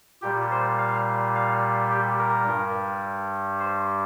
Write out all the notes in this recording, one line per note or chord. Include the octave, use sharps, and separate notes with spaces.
A#2 G3 G4
C5
F5
F5
G4
A#4
G2 G3
C5